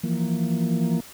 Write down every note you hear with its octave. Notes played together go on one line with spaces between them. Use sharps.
E3 F3 A#3